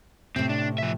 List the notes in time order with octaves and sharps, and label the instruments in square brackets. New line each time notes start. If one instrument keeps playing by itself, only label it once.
[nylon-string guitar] A2 C3 [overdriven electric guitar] C4
[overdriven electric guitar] D4
F3 E5